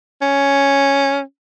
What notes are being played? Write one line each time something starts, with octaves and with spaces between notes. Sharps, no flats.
C#4